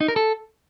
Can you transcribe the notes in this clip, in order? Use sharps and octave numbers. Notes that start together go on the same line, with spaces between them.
D#4
A#4
A4